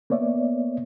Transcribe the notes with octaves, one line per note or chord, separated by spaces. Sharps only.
A#3 B3 C#5 D5 E5